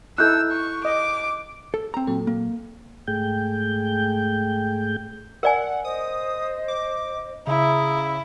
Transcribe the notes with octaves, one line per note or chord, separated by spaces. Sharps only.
D#4 E4 A4 E6 F#6 G6
C#6
D#5 D6
A4
C4 A#5
A#2 F#3 A4
A#3
G#2 A3 G#4 G5 G6
A#4 D5 F#5 G#5
C5 D#5 D#6
D6
C#3 E4 A#5 D#6